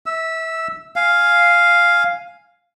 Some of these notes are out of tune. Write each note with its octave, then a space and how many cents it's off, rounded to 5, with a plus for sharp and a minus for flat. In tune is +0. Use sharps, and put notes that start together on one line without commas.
E5 -25 E6 +0
F5 +0 G#5 +0